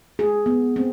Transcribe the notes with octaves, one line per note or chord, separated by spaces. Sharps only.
G#4
B3
C4